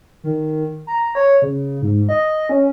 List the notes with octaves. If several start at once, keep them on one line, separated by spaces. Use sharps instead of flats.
D#3
A#5
C#5
C#3
G#2
D#5
C#4